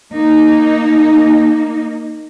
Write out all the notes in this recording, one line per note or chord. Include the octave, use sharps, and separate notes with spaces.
A#3 D#4